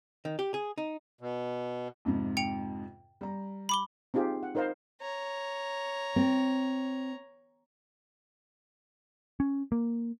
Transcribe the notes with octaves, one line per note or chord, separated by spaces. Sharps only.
D#3
G4
G#4
D#4
B2
F2 G#2 C3
G5 C#7 F7
G3 A#5
B5 D6 G7
C4 D#4 F4 G4 G#4
F#5
D#4 A#4 C5 D#5 F5
C#5 A#5
C4
C#4
A#3